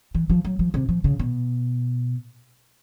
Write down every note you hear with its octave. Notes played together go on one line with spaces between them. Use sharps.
E3
F3
F#3
F3
C3
F3
C#3
B2